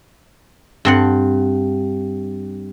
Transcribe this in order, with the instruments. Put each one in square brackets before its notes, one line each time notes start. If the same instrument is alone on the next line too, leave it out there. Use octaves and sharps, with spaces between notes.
[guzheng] G2 C4 F#5